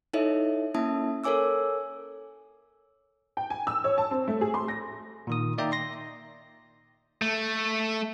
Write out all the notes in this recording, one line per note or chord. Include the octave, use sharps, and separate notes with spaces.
D#4 E4 A4 C#5 D#5 E5
A#3 C#4 E4 E5 A5 D#6
A4 A#4 C#5 G#5 D6 E6
G5
G#5
E6
C#5
A5
C4
A3
G#4
C6
A#6
A#2 D#3 D#6
A#3 D#4 D5 E5 G5 A#5
C6 A#6
A3